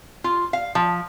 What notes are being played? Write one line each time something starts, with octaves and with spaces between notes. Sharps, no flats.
F4
F5
F3